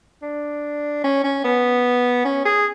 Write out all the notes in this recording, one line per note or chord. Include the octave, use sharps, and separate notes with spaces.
D4
C#4
C#4
B3
C#4
G#4